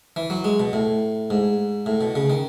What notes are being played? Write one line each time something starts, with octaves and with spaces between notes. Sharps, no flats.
E3
F#3
G#3
B2
A2
G#2
A2
B2
C#3
D#3